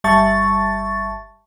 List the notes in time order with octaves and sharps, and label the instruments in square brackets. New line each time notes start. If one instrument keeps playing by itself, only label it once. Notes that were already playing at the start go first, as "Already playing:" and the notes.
[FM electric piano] G1 G3 E5 A5 C#6 A6